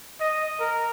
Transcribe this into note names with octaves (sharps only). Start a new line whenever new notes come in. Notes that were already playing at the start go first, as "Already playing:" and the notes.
D#5
A#4